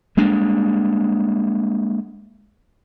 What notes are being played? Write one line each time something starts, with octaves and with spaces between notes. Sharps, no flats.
G3 G#3 A#3 D4